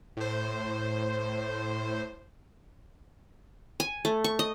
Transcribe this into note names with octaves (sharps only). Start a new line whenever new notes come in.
A2 C5
G#5
A3
C#6
D#5